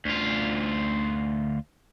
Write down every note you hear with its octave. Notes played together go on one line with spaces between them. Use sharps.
D2 F4